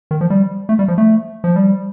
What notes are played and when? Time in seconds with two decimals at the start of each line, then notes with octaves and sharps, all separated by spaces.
0.11 D#3
0.21 F3
0.30 G3
0.69 A3
0.79 G3
0.88 F3
0.98 A3
1.44 F3
1.56 G3